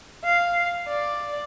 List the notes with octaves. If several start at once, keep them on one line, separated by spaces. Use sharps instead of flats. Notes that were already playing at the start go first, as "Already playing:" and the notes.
F5
D5